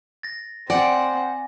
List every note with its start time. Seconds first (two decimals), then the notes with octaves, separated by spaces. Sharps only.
0.23 A6 A#6
0.70 C4 D5 F#5 G#5 A#6